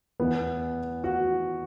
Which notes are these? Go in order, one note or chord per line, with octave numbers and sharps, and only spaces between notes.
E2 E3 B3
F#4